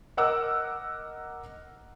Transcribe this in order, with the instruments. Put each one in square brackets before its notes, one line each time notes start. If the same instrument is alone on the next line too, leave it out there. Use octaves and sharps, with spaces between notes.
[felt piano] A#4 D#5 F#5 D6 E6